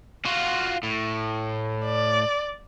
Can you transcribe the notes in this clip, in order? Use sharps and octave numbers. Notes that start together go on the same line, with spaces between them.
F4 F#4
A2
D5